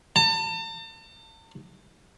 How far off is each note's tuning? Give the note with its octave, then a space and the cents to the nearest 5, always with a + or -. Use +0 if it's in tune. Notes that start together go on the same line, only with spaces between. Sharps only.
A5 +40